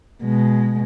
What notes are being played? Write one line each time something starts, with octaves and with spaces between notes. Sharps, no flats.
B2 G#3